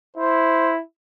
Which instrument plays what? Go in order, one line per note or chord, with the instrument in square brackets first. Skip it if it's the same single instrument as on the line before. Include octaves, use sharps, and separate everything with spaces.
[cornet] E4 [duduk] C5